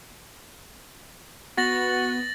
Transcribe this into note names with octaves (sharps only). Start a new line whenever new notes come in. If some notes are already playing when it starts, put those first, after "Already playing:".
B3 F#4 A6 A#6 F#7